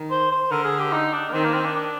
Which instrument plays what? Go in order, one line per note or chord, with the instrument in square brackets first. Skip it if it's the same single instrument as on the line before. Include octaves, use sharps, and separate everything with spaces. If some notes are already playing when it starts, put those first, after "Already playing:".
Already playing: [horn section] D#3
[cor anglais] C5
C5
[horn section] D3 [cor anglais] A#4
[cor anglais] G#4
G4
D#4
D4
A#3
[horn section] D#3 [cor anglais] C4
[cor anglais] A#3
C4
D4
D4